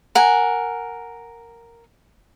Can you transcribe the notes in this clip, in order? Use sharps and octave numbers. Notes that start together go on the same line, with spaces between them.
A#4 F#5 G#5